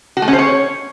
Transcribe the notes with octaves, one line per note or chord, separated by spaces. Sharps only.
F#4
A3
C#4
C5
C#5